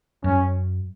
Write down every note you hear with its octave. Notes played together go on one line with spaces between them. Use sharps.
F#2 C#4